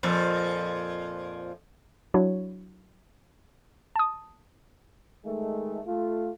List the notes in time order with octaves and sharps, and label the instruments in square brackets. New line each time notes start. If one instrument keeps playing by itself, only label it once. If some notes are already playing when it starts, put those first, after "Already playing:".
[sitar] F2 A#2 F3
[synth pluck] F#3 D4 E4 F#4 C#5
A5 D#6
[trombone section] D#3 G#3 A3
A3 F4